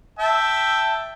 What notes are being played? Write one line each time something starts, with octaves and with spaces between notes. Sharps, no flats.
E5 G5 A5